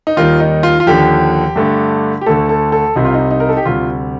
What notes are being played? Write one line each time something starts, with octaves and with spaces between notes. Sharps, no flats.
D#4
D#2 D#3 G3 F4
D#4
F4
F4
D#2 D3 F3 G4
G2 D3 A3
G4
D2 D3 A3 A4
A4
A4
C2 C3 G3 D#4
F4
D#4
D#4
A#4
A4
G4
D2 C3 G3 F4